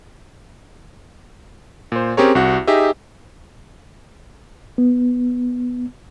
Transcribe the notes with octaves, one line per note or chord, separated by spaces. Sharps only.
A#2 C5
C4 C#4 G4 G#4 A#4 C#5
C2 F#4 F#5
D#4 G4 G#4 D#5 E5
B3